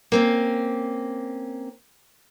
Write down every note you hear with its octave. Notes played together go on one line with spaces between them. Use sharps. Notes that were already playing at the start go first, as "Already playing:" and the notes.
A#3 C4 C#4